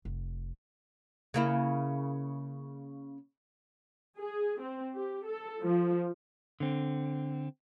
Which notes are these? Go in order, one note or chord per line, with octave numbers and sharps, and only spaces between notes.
F1
C#3 A#3 E4
G#4
C4
G4
A4
F3
D3 C4